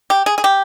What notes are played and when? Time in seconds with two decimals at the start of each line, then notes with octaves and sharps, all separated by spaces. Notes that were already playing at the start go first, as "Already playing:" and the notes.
0.10 G4
0.26 G#4
0.38 G#4
0.44 G4